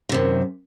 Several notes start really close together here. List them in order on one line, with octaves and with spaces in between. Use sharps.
D#3 C3 F#2